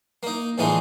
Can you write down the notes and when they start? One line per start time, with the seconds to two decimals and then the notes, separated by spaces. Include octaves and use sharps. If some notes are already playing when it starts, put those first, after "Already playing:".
0.23 A#3 D#4
0.58 A2 D3 E3 F3 G#3 D#4